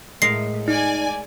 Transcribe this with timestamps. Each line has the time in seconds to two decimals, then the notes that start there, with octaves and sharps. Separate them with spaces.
0.22 A2 G#3 A#4 F5 C7
0.68 D#4 D5 G#5